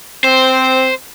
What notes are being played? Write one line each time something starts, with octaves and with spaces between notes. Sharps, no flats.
C4 C5